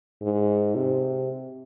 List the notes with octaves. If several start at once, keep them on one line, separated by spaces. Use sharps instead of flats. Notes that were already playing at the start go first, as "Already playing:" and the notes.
G#2
C3